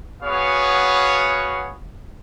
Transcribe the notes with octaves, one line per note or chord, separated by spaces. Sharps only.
B3 F#4 G#4 C#5 F5